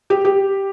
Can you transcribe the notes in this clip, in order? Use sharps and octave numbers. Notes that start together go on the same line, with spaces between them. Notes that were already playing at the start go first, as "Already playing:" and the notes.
G4
G4